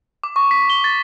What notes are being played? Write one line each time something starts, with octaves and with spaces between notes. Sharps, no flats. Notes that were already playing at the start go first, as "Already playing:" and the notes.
D6
C#6
B6
G7
A6